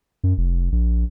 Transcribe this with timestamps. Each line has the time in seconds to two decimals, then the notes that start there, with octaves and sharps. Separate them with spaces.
0.24 F#2
0.38 F1
0.72 A#1